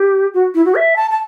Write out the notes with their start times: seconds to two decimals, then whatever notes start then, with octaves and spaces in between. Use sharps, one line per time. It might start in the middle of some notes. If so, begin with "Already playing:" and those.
Already playing: G4
0.34 F#4
0.55 E4
0.65 F#4
0.75 E5
0.96 A5
1.11 A5